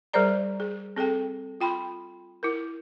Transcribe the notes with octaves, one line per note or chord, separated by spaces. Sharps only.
G3 G#4 A#4 C5 D5 A#5
G#4
C4 G#4 A4 G5
F4 G5 B5 C6
E4 A#4